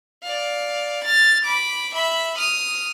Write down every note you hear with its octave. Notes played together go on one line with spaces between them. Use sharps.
D5 F5
F6 A6
B5 D6
E5 B5
D#6 F6